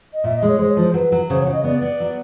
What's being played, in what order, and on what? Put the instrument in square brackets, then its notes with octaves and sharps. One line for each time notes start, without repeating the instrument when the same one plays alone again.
[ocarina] D#5
[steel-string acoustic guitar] A#2 [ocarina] E5
[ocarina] D#5
[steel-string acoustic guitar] G#3
[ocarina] C#5
[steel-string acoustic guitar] G#3 [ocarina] C5
[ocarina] C#5
[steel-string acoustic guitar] F3 [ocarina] C5
[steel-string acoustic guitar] F#3 [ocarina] B4
[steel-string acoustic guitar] F#3
[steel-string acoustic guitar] C#3 [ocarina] C5
[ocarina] C#5
[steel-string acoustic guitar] C#3
[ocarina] D#5
[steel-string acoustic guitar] B3 [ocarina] D5
[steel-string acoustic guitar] B3
F#3